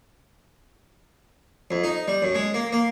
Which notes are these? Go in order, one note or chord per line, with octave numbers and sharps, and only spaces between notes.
F2
D#4
G3
F#2
G#3
A#3
A#3